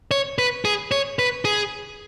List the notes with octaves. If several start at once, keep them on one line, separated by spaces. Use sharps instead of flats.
C#5
B4
G#4
C#5
B4
G#4